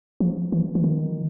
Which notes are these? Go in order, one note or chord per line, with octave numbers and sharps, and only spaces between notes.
F3
E3
E3
D#3